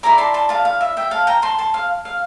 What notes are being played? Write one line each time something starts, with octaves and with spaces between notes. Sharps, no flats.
E4 A#4 D5 A#5 D6
A5 C6
A5 C6
F5 A5
F5
E5
E5 G5
F5 A5
G5 A#5
A5 C6
A5 C6
F5
F5